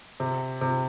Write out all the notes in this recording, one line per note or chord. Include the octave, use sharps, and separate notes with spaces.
C3
C3